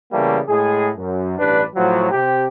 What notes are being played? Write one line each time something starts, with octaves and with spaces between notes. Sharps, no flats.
C#3 E3 G3 A3 A#3
A2 G#3 G#4
F#2
A1 G2 D4 B4
A2 F3 F#3
C3 G4